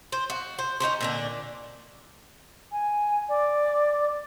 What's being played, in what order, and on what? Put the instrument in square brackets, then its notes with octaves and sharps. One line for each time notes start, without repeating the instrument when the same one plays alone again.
[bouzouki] C5
F#4
C5
C#4 D#4 F#4 C5
A#2 D3 D4
[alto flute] G#5
D5